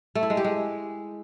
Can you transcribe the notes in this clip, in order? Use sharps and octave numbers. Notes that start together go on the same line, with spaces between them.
A3
E4
G#3
G4
G#3